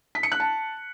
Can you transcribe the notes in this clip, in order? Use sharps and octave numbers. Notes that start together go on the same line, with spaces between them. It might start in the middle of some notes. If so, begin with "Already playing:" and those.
B6
C#7
F#6
A5